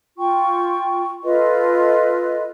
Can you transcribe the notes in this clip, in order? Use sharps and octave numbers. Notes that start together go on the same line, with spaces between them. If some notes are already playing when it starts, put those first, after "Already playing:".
F4 G5 C#6
F4 A4 B4 D#5